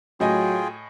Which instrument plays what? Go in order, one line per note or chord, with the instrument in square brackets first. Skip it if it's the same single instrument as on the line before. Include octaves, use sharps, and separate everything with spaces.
[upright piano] A2 D#5 G#5 [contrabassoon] F#3 [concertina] F4 G#4 G5